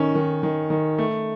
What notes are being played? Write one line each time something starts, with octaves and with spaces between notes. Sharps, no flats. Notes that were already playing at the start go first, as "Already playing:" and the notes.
Already playing: D#3 C#4
D#3
D#3
D#3
A3